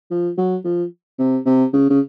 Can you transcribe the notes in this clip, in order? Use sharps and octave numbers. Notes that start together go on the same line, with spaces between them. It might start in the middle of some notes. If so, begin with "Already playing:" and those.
F3
F#3
F3
C3
C3
C#3
C#3